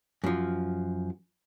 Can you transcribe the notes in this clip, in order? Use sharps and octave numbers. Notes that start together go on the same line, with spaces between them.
F#2 F3